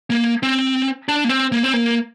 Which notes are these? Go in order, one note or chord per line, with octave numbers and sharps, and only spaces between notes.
A#3
C4
D4
A#3
C4
A#3
C4
A#3